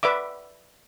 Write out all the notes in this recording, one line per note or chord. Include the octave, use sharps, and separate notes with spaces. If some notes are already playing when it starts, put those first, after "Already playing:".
B4 D5 E5 D6